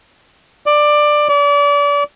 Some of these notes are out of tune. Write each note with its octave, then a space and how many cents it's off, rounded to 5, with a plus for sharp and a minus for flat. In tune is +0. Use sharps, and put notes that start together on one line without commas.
D5 +15
D5 -35